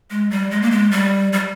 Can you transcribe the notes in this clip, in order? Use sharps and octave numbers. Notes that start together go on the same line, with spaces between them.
G#3
G3
G#3
A#3
G#3
G3
G3